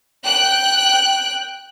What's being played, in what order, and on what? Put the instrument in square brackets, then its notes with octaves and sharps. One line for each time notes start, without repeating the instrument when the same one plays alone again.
[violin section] G5 F#6